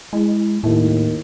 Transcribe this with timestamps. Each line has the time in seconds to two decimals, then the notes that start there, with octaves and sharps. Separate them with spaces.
0.13 G#3 E4
0.63 D#2 A2